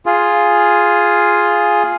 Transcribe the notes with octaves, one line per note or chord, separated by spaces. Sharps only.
F4 G#4